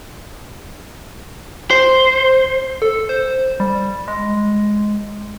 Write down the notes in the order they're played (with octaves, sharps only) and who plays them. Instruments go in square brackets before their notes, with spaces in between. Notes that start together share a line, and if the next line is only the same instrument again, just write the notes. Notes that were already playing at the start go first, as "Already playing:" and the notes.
[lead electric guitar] C5
[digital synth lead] A4
C5
G3
G#3